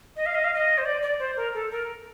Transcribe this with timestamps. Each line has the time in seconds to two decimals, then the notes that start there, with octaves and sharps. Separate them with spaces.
0.16 D#5
0.26 F5
0.35 D#5
0.44 F5
0.54 D#5
0.78 C5
0.85 D5
1.02 D5
1.19 C5
1.37 A#4
1.54 A4
1.71 A#4